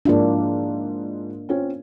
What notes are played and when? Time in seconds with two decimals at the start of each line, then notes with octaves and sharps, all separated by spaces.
0.05 G#2 F3 A#3 D4 E4
1.49 C4 C#4 F4